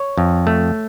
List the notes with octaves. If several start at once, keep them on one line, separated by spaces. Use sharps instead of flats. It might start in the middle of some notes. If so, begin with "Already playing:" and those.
Already playing: C#5
F2
A3